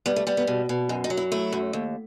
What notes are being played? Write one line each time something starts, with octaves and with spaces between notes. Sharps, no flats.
G3 B3
A3
G3 B3
B3
B2
B2
F#2 D#4
D#4
F#3
E4
A3 E4
F#2
D#2